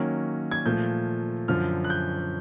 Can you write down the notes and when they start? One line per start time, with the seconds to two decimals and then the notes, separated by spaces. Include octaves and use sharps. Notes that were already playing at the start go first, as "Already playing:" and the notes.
Already playing: D#3 F#3 A#3 C#4
0.51 G#6
0.65 A#2 F3 A3 G6
1.48 F#2 D3 F3 F6
1.84 F#6
1.90 G6